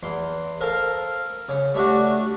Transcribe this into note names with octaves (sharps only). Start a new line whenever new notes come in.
E2 C6
A4 A#4 C5 F5
C#3
G3 A3 D4 F#4